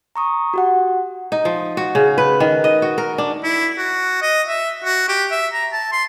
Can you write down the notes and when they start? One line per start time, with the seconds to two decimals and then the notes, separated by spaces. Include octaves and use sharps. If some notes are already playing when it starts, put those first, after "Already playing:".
0.16 A#5 C#6 D#6
0.54 F#4 G4 F#5
1.32 D#4
1.45 F3
1.77 F#4
1.95 C#3
2.18 B4
2.40 D#3
2.64 D#5
2.82 F#4
2.98 A#4
3.18 D4
3.43 E4
3.78 F#4
4.22 D#5
4.48 E5
4.84 F#4
5.09 G4
5.31 E5
5.53 A#5
5.72 A5
5.92 C6